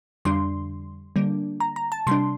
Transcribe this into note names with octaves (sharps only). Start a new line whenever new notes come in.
F2 D3 G3 D4 C6
D3 G3 A#3 D4
A#5
A#5
A5
C3 G3 D4 C6